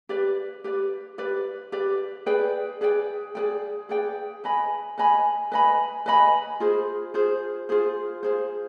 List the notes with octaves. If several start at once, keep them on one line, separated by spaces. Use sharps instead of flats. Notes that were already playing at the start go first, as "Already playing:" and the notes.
G4 B4 D5
G4 B4 D5
G4 B4 D5
G4 B4 D5
G#4 B4 D5 G5
G#4 B4 D5 G5
G#4 B4 D5 G5
G#4 B4 D5 G5
B4 D#5 G#5 B5
B4 D#5 G#5 B5
B4 D#5 G#5 B5
B4 D#5 G#5 B5
F4 G#4 C5
F4 G#4 C5
F4 G#4 C5
F4 G#4 C5